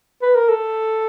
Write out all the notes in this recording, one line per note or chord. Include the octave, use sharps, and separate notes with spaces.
B4
A#4
A4